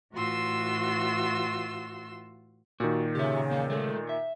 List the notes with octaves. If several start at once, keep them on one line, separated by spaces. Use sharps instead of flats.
A2 E3 F4 F#4 C6 E6
A#2 D#3 F#4
C#3 G4 E5
E2 A#3 F5
G#3 A3
E5